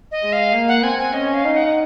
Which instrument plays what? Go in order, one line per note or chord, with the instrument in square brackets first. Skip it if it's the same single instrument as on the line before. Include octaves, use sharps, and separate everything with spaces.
[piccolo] D#5
[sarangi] G#3
[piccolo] F5
[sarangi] A#3
[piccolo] F#5
[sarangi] C4 [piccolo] G#5
[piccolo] G#5
[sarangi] C#4 [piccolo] D#5
[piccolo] F5
[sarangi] D#4
[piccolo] F#5